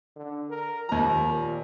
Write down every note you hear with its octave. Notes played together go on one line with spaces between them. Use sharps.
D3
A#4
D#2 F3 A#5
A#2